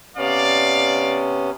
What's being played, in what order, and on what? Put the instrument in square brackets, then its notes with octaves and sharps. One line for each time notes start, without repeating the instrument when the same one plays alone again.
[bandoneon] C3 B3 C#4 [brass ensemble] D5 F5